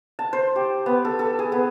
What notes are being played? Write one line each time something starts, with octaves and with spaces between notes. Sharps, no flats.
A5
C5
G4
B3
A4
A4
G#4
B3